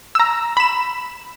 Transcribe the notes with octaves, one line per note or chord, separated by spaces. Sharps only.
A#5 E6
B5 E7